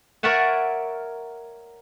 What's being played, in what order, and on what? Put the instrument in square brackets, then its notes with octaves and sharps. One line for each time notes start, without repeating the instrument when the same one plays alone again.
[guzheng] A#4 C#5 D5 E5 F#5 G#5